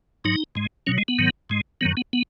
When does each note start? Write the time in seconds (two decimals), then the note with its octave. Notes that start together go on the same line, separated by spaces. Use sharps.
0.24 G#2 F#3 D#4
0.55 G#2 G#3
0.87 B2 F#3 C#4
0.98 G#3
1.08 B3
1.18 G#2 D#3 F#3
1.50 G#2 G#3
1.81 F#2 D#3 F#3 B3
1.97 B3
2.13 B3